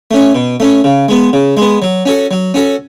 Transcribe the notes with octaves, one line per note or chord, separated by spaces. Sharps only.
A3 C#4
B2
A3 C#4
C#3
G#3 B3
C#3
G#3 B3
F#3
C#4 F#4 A4
F#3
C#4 F#4 A4